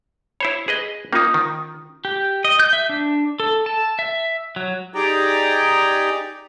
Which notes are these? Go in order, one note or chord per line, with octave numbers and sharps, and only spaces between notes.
E4 C5 C#5 B5
G#4 B4 D#5
A#3 C#4 D#4 F4 D#6
D#3
G4
D#5
G6
E5
D4
A4
A5
E5
F#3
D#4 G4 G#4 D5 G5 A#5